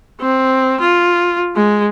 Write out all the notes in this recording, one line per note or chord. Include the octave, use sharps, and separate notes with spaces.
C4
F4
G#3